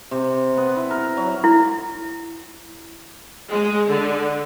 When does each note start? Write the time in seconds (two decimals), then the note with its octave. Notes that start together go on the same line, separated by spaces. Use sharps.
0.11 C3
0.57 B3
0.76 E4
0.90 A#4
1.17 F#3
1.44 E4
3.50 G#3
3.89 D3